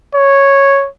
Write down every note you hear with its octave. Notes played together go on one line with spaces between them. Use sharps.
C#5